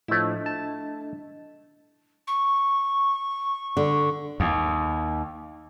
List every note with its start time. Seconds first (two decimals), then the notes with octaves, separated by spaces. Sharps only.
0.08 A2 F3 A3 D4 E4 D#5
0.46 A5
2.27 C#6
3.77 D3
4.40 D#2